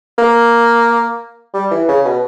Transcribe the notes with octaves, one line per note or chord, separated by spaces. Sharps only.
A#3
G3
E3
C#3
B2